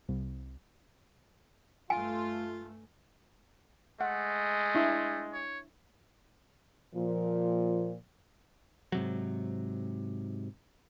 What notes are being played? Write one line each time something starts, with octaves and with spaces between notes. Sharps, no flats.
C2
G2 A3 F4 G#5
G#3 A3 F#5
D4 E4
C#5
A#2 F3
G#2 C3 F#3